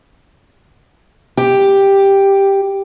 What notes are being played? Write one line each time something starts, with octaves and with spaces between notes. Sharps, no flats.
G4